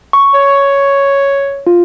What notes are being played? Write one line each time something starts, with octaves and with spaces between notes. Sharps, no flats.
C#6
C#5
F4